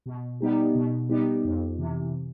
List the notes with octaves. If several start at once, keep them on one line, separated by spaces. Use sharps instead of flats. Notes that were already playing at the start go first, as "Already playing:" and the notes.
B2
G3 B3 D#4 G4
B2
G3 B3 D#4 G4
F2
C3 E3